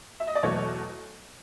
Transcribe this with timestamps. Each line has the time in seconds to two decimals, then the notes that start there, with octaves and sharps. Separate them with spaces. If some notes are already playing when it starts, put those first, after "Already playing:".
0.20 E5
0.27 D#5
0.35 D5
0.43 E2 B2 F#3 A3 C#5